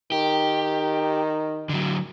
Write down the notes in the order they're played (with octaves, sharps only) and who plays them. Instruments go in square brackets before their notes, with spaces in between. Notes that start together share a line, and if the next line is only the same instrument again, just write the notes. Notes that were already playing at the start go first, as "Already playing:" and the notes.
[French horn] D#3 [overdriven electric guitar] G4
[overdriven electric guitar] D3 F#3